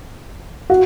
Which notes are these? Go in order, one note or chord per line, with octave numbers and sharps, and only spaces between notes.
F#4